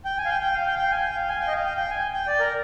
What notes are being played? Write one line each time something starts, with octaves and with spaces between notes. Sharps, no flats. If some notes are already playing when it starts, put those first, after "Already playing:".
G5
G#5
F5
G5
G5
F5
G5
F5
G5
G#5
G5
F5
G#5
G5
D#5
F5
G5
G5
G#5
G5
D5
A#4